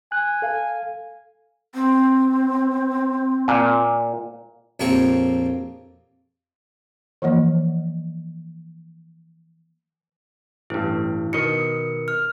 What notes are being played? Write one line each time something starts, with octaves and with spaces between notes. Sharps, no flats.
G#5 F#6
A4 F5
C4
A#2
A#1 F2 A#3 C4 G4 C#5
E3 F3 A#3 D#5
A1 G2 E4
B2 D#3 A#4 D#5 C#7
F6